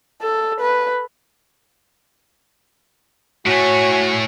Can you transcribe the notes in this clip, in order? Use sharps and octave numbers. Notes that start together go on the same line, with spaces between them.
A4
B4
A2 A3 F#4 C#5 G#5